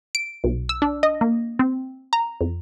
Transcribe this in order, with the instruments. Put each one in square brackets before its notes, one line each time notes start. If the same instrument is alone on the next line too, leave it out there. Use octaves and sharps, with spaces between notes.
[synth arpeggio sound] D7
B1
E6
D4
D#5
A#3
C4
A#5
F2